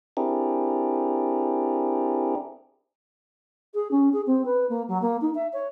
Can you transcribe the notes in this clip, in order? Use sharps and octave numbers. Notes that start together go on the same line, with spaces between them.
C4 D4 E4 G4 G#4 A#4
G#4
C#4
G#4
C4
B4
A#3
F#3
A#3
D#4
E5
C#5